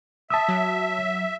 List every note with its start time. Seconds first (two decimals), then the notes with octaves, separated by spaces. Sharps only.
0.30 E5 A5 D#6 E6
0.48 F#3